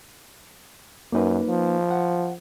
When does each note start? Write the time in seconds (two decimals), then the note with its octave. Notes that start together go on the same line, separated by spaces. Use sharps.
1.12 F#2 A#3 D#4 B4
1.47 F3
1.91 F#5